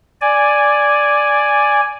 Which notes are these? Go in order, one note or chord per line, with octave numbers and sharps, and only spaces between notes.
D5 G#5